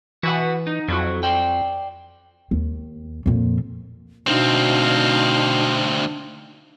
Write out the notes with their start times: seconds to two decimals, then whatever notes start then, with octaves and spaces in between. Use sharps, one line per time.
0.23 E3 F#4 B4 F#5
0.67 D#4
0.88 F2 F#3 E4 F#4
1.23 C5 D5 G5
2.51 D#2
3.26 F2 A#2
4.27 D2 B2 C4 D4 D#4 F5